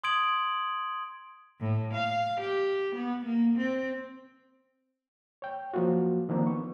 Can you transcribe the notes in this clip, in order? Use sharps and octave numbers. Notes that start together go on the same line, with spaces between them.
C6 D#6 G#6 D7 F#7
A2
F5
G4
B3
A#3
C4
C#5 G5
F3 F#3 A#3 F4 F#4
D#3 F3 A#3 C4 D4 D#4
B3 C#6